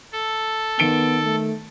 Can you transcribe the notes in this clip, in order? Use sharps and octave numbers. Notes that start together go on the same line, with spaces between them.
A4
D#3 B3 D7 G7
A3